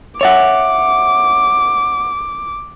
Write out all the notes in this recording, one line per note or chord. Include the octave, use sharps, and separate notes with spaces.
C#5 E5 F#5 D6